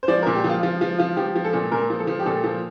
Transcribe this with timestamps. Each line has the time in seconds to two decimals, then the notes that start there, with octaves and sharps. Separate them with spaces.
0.03 C5
0.08 F3 D5
0.23 A#4
0.27 A#2
0.35 G4
0.44 F3
0.49 F4
0.63 F3 F4
0.81 F3 F4
0.99 F3 F4
1.17 F3 G4
1.36 F3
1.44 A4
1.53 A#2
1.72 A#2 A#4
1.90 F3
1.99 A4
2.07 F3
2.20 G4
2.26 A#2 A4
2.44 F3